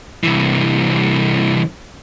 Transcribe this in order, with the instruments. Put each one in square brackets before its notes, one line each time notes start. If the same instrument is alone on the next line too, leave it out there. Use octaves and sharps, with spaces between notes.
[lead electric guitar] C2 E3